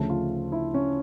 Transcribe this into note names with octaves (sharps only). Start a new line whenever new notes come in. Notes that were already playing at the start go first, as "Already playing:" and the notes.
Already playing: D2 C#3 F3 A3
F4
E4
C#4